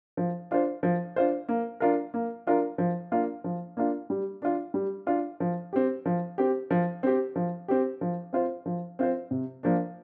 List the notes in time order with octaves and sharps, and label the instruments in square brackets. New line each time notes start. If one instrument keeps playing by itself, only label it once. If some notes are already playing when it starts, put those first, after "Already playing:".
[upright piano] F3
D4 F4 C5
F3
D4 F4 C5
A#3
D4 F4 A#4
A#3
D4 F4 A#4
F3
A#3 D4 F4
F3
A#3 D4 F4
G3
D4 F4
G3
D4 F4
F3
C4 G4
F3
C4 G4
F3
C4 G4
F3
C4 G4
F3
C4 F4 C5
F3
C4 F4 C5
C3
F3 A#3 D4